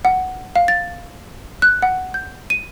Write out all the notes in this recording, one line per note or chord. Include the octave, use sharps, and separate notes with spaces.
F#5
F5
A6
F#6
F#5
G6
D#7